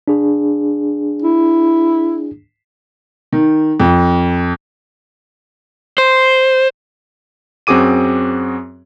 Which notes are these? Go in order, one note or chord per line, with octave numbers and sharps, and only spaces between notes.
D4 G#4
E4
D#3
F2
C5
F#2 C4 F#4 G#4 D6 D#7